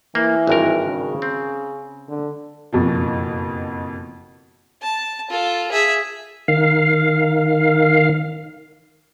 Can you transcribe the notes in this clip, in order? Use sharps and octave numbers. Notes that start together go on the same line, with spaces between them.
E3 A#3
G#1 G2 A#4
C#3
C4
D3
F#1 F2 B2 F3
A5
F4 A4
G#4 E5
D#3 F5